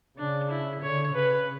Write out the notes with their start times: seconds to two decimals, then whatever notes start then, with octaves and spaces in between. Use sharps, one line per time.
0.18 C#3 D4
0.50 E4
0.82 D3 C#5
1.14 C#3 B4